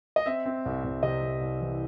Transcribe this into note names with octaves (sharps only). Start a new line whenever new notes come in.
D#5
C4 E5
C4
C2
C2
C3 D#5
C3
C2
E3